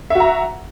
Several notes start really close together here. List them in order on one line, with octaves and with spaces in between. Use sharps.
E5 F#4 A#5